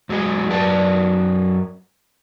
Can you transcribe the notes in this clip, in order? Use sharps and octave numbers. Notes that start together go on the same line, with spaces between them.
F2 F#3 G#3 G#4
F#2 F#3 B4 D5 A5